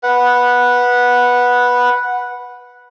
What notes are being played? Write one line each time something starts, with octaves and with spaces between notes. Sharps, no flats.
B4 F#5